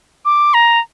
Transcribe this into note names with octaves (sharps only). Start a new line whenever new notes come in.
D6
A#5